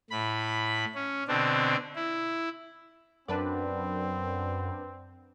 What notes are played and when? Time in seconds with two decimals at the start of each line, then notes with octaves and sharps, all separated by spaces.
0.11 A2 B5
0.95 C#4
1.28 B2 D3 C4 D4
1.96 E4
3.28 F#2 C4 D4 B4 D5